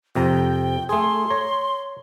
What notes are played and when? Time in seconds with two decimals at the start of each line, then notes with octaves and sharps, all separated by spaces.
0.15 F2 C3 G5 A#5
0.89 A3 G#4 C6
1.30 C#5 A#5